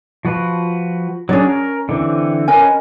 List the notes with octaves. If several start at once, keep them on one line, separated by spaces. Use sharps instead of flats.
F3 F#4 B4
F#3 C#4 D4 G#4 C#5
A#4
D3 E3 C4
C#4 A#4 B4 D#5 G#5